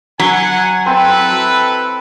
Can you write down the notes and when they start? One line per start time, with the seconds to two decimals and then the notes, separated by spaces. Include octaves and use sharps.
0.19 F#3 F#5 G#5
0.86 C4 E4 A4 B4